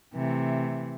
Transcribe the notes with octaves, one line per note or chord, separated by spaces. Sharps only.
C3 E3 A3